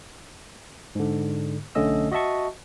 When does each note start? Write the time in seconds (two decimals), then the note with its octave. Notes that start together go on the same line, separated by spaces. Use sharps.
0.95 G#2 D3
1.75 B1 D3 A3 C#4 D#5 E6
2.11 F#4 D#5 E5 A5 C#6